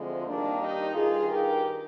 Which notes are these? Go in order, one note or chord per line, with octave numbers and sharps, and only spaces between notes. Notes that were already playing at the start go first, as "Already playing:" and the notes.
Already playing: D2 D3 F3 G#3 C4
G2 D#3 A#3 D4
D#4 G4
G2 D#3 F4 G#4
G4 A#4